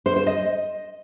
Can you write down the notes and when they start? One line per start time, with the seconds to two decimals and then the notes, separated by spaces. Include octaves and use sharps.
0.06 C5
0.16 C5
0.27 D#5